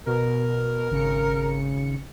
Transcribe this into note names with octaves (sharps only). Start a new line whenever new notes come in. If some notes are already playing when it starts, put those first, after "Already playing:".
B2 A#4
G#1 C#3 C#7